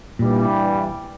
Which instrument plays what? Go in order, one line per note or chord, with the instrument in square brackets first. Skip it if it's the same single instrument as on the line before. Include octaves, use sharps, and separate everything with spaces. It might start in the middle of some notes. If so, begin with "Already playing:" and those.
[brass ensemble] G2 E3 G3 [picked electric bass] A#2